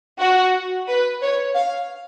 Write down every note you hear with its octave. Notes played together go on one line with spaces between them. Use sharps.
F#4
B4
C#5
F5